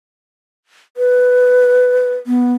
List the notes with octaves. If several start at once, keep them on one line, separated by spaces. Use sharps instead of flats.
B4
B3